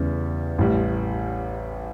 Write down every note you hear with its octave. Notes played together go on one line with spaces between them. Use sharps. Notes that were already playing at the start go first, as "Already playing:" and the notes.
Already playing: E2 C#3 G3
A1 A2 G3